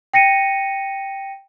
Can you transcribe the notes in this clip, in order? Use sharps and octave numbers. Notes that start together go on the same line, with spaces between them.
G5 A#6 C#7 D#7